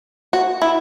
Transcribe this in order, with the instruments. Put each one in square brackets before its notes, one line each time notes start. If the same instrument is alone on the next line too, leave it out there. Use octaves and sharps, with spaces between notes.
[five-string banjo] F#4
E4